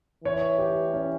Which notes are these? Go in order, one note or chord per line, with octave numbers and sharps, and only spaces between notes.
E3 C#5
G4
C#4